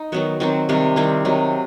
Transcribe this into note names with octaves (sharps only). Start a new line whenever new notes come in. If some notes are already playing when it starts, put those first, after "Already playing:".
Already playing: D#4
D#3 F#3 B3 F#4
D#3 F#3 C4 F#4
C3 D#3 G3
D#3 G3 C4 E4
C3 D#3 F#3